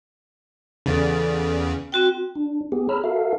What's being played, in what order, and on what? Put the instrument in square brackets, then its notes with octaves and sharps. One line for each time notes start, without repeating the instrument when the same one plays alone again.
[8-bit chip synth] E2 C#3 [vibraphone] A4 D5
[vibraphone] C4 F#4 G5
[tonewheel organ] D4
B3 G4 G#4
G#4 C#5 A#5 B5 E6 F6
F#4 A4 A#4 E5 F5